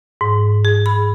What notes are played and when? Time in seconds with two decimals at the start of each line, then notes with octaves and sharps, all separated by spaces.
0.21 G#2
0.65 G#4
0.86 B5